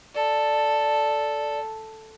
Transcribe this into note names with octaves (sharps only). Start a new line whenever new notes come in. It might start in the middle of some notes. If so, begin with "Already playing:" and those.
A4 D5